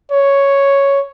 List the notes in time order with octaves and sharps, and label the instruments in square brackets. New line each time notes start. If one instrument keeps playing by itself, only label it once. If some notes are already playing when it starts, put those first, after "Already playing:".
[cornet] C#5